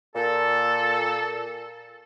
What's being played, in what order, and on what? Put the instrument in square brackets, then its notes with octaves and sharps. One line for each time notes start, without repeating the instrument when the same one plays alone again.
[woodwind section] A#2 A4